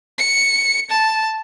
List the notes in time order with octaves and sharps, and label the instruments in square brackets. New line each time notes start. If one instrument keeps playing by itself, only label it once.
[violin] C#7
A5